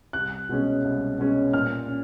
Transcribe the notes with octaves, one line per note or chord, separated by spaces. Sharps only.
C2 F#6
B2 G#3 C#4
C2
B2 G#3 C#4
A#2 F6
C#4